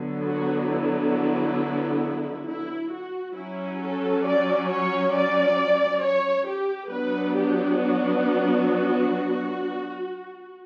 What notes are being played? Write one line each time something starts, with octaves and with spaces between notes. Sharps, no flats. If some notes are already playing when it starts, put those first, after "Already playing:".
Already playing: D3 F#3 B3
F#4
E4
E4
F#4
F#3 C#4 E4
A4
D5
C#5
D5
C#5
G4
F#3 B3 D4 B4
G4
F#4